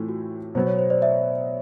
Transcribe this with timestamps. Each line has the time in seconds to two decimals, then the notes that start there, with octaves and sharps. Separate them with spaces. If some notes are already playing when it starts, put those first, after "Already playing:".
Already playing: A2 E3 A3 C4 F4
0.09 F#4
0.55 B2 F#3 B3 C5
0.67 C#5
0.79 C5
0.90 C5 D5
1.02 D5 E5